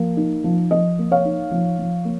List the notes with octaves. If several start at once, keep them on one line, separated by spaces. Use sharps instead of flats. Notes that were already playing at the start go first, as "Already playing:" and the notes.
Already playing: F3 A#3
D#4
F3
F3 D#5
A#3
C#5 F5
D#4
F3
F3
A#3